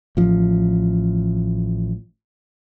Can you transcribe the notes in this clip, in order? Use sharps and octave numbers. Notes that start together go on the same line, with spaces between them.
A1 F3